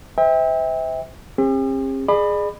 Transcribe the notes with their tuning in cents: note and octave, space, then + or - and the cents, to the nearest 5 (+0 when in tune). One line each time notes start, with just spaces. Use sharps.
C5 -35 E5 -30 G5 +30
C4 +40 G4 +45
G#4 +0 D5 +40 B5 +0